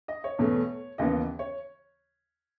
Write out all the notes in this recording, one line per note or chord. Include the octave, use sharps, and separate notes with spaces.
D#5
C#5
E2 B2 A3
D#2 C#3 E3 B3 D#5
C#5